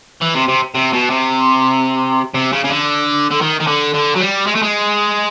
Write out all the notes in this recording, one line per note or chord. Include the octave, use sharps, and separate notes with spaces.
E3
C3
C3
C3
B2
C3
C3
C#3
C#3
D3
D3
D#3
D#3
D3
D3
F#3
G3
G#3
A3
G#3